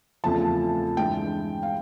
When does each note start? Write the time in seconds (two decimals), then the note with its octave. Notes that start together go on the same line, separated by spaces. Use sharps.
0.24 E2 C#3 F3 A3 C4 A5
0.97 G2 E3 G#3 G5
1.63 F5